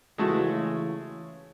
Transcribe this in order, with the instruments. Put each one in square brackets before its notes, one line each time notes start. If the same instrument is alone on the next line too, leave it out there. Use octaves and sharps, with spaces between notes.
[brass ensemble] C#3 E3 [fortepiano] G#3 A3 F#4